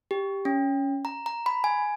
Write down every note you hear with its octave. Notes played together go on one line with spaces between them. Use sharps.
G4
C#4
A#5
A#5
B5
G#5